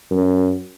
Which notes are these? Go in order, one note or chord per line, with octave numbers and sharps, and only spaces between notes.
F#2